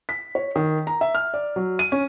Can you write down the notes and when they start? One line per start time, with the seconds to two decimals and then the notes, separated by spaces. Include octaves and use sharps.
0.09 B6
0.35 C#5
0.56 D#3
0.87 A#5
1.01 E5
1.15 F6
1.34 D5
1.56 F#3
1.79 D#7
1.92 C#4